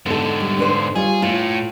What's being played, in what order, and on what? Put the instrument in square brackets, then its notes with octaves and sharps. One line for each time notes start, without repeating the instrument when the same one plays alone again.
[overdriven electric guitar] G#2 D3 [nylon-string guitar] B3 A4
[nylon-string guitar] G3
D4 B4 C5
[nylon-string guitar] G3 F4 C#5 [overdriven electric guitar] G#4
[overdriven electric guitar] A2 [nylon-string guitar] F4